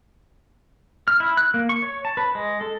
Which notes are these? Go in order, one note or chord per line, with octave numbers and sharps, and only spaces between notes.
F6
E4
F#6
A#3
C#6
C#5
A5
B4
G#3
A4